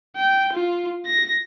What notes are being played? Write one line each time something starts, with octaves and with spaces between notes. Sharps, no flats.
G5
F4
A#6